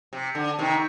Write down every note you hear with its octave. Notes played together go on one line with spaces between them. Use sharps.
C3
D3
C3 D#3